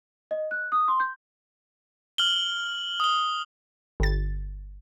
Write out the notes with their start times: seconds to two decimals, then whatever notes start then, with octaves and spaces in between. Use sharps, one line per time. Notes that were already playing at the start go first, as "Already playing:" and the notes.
0.31 D#5
0.51 F#6
0.72 D#6
0.88 C6
1.00 G6
2.18 F6 F#7 G7
3.00 D#6 G7
4.00 G1 A6